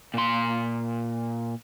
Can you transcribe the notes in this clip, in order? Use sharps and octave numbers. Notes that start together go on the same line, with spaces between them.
A#2 C6